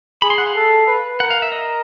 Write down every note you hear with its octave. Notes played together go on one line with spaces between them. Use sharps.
G#4 B5
C6
F#5
F5
A4
B4
A#4 F#5
F5
E5
D#5